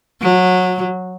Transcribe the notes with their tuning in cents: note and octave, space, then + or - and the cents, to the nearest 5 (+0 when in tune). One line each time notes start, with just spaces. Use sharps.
F#3 -20